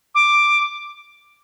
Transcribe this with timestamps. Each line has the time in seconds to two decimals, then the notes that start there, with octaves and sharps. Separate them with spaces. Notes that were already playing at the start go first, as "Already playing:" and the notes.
0.15 D6